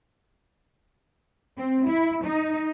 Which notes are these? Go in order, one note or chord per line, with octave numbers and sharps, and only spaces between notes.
C4
E4
D#4